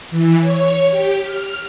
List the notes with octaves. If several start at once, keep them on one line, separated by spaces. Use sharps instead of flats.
E3
C#5
G4
F6